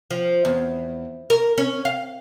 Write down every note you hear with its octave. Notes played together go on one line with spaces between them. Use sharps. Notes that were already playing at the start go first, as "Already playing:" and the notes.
F3
E2
A#4
C#4
F5